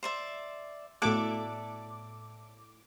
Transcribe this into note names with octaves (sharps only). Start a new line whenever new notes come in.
C5 D5 E5
A2 A3 B3 F#4 A4 D5 E5 D6